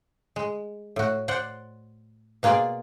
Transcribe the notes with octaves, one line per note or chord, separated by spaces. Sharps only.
G#3
A2 F#4
C5 D5 F#5
B2 A#3 F4 G#4 D5